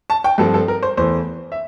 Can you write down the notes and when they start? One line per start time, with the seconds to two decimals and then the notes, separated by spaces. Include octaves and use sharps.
0.10 A5
0.24 G5
0.38 G2 F3 C4 A4
0.54 A4
0.68 A#4
0.82 C5
0.97 E2 E3 A3 C5
1.52 E5